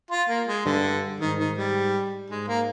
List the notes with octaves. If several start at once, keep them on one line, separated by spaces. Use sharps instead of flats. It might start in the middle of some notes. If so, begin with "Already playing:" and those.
F4
A#3
G#3
G2 D3
G#2 D#3
D#3
G3
G#2 G#3
A#3